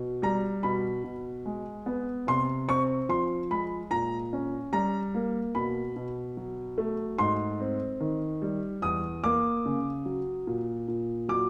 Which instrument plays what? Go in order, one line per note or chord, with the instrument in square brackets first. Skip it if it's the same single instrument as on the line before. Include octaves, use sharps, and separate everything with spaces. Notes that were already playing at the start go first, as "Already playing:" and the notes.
Already playing: [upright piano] B2
G3 A#5
B2 B5
B2
G#3
B3
C3 C6
C4 C#6
F3 C6
G#3 B5
A#2 A#5
C#4
G3 A#5
A#3
B2 B5
B2
F#3
A3
G#2 C6
C4
D#3
G3
E2 D#6
A#3 D6
C#3
F#3
A#2
A#2
F#3 D6